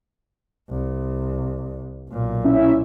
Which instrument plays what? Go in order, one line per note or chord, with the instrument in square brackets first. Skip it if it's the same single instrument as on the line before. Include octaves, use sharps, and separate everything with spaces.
[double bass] C2
B1 A#2
[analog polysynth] C#4 E4 E5